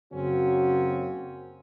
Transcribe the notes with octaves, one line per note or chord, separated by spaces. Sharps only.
F#2 C#3 A#3 C4 C#4 F#4